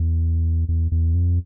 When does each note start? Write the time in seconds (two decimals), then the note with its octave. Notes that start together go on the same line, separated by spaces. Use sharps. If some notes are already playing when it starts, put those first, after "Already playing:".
Already playing: E2
0.68 E2
0.92 E2
1.14 F2